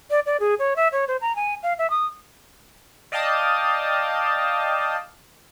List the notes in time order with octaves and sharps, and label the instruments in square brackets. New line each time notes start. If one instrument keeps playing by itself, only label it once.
[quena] D5
D5
G#4
C#5
E5
C#5
C5
A#5
G#5
F5
E5
D#6
[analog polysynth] D5 D#5 F5 G5 A5 D#6